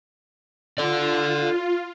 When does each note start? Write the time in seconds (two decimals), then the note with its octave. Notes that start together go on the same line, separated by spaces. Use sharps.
0.78 F4 A4 D5